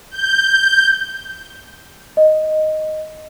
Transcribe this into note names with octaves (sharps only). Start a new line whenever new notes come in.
G6
D#5